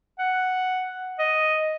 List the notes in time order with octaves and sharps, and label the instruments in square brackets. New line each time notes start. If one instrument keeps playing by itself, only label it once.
[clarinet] F#5
D#5